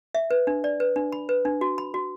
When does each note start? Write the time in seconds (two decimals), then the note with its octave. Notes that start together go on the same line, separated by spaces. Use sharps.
0.15 E5
0.31 B4
0.47 D4
0.64 D5
0.80 B4
0.96 D4
1.12 B5
1.29 B4
1.45 D4
1.61 F#4
1.78 B5
1.94 F#4